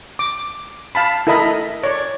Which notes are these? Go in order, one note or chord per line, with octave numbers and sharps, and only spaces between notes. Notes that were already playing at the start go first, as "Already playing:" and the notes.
D6
F5 A5 B5
E4 A4 A#4 D#5 B5
C#5 D5